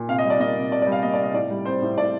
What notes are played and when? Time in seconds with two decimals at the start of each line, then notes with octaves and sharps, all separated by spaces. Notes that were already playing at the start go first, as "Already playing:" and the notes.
Already playing: A#2
0.09 C3 F5
0.18 D#5
0.25 G3
0.30 D5
0.40 A#3 D#5
0.56 C3
0.71 C3 D5
0.82 D5
0.87 G3 F5
1.02 A#3 D#5
1.13 D5
1.19 C3 D#5
1.34 A2 D5
1.51 G3
1.65 C4 C5
1.82 A2
1.97 A2 D5